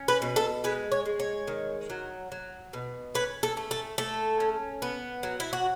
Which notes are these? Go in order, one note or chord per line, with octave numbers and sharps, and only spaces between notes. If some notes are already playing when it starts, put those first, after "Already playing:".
Already playing: C#4
B4
B2
A4
G#3 B4
C#5
G#3
C#5
D#3
F#3
F#3
B2
C#4 B4
A4
A3
A4
A3 A4
C#4
B3
F#3
E4
F#4